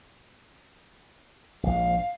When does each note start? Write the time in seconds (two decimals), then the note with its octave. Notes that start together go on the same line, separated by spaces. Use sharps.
1.63 A#1 G#2 F5